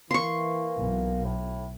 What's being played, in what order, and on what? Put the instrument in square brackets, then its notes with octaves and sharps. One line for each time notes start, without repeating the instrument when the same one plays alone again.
[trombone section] E3 [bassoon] A#3 [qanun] C6 C#6
[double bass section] B1
[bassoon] A2